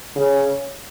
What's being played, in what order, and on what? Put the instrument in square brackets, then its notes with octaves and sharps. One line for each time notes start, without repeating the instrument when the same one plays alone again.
[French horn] C#3